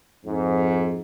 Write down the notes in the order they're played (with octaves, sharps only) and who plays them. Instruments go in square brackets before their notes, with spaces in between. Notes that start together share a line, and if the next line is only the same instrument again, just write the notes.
[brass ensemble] F2 G#2